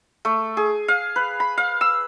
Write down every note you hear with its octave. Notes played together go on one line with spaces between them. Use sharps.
A3
G#4
F5
B4
B5
F5
E6